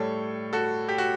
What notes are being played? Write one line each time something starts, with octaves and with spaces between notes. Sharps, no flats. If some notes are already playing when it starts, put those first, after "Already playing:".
Already playing: A2 G3 A4 C#5
F#4 A4
G4
F#4